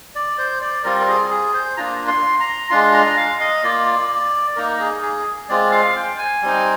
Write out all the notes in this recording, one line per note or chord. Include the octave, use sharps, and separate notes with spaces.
D5
C5
D5
G3 C4 F4 A#4
A#4
G#4
G#4
C5
A#3 D4 F4 A#5
C6
A#5
G#3 D4 F4 C6
A#5
F5
D#5
A#3 F4 D5
A#3 D#4 A#4
G#4
G#4
G#3 C4 F4 D5
F5
G5
G#5
G3 C4 D#4